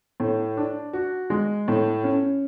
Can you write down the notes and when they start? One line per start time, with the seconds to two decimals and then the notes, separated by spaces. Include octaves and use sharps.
0.20 A2
0.57 D4
0.93 F#4
1.30 G#3
1.68 A2
2.04 C#4